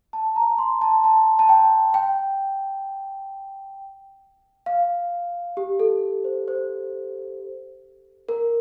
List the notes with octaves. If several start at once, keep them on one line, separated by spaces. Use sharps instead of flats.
A5
A#5
C6
A5
A5
A5
G5
G5
F5
G4
A4
C5
C5
A#4